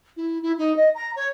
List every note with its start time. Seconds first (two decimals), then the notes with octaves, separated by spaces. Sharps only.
0.17 E4
0.42 E4
0.58 D#4
0.76 D#5
0.95 A#5
1.16 C#5